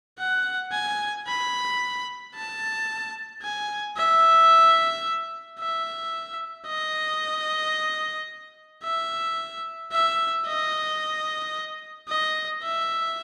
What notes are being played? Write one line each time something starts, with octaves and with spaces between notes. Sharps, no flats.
F#5
G#5
B5
A5
G#5
E5
E5
D#5
E5
E5
D#5
D#5
E5